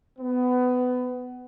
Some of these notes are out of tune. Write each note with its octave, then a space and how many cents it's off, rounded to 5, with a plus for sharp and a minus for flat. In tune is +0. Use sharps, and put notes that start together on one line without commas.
B3 +20